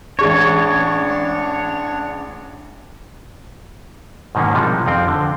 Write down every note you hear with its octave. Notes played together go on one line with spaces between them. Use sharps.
A1 G#3 D4 C#5 C#6
G#2 B2 D#3 A#3 C#4
C3 F3 G3 G#3 D#4
F2 F3 C4 G5
D3